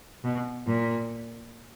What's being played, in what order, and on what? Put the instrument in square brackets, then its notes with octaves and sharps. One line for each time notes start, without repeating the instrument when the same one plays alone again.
[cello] B2
A#2